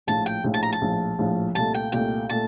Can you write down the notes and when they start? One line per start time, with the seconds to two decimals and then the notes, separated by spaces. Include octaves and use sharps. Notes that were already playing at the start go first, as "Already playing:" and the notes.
0.07 A#1 A2 F3 A5
0.26 G5
0.44 A#1 A2 F3
0.54 A5
0.63 A#5
0.72 A5
0.81 A#1 A2 F3
1.19 A#1 A2 F3
1.55 C2 A#2 A3 A5
1.74 G5
1.92 C2 A#2 A3 G5
2.29 A#2 A3 A5